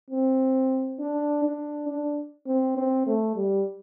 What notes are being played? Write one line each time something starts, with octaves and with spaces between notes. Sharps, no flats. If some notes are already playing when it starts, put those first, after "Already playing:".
C4
D4
D4
D4
C4
C4
A3
G3